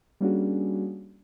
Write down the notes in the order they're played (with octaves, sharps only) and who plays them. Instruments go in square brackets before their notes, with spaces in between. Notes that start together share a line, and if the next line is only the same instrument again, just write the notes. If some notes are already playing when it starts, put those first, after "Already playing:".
[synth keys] G3 A#3 C#4 D4 F#4 G#4